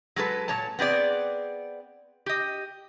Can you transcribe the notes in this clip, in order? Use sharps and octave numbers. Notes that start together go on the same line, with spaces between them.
F#3 G#3 A4 B4
A#2 C#5 A5
B3 C4 G#4 D5
G4 D#5